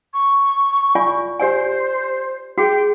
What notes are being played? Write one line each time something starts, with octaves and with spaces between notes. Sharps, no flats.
C#6
F4 D5 G#5
G4 C5 D5 G#5
F#4 G#4 G5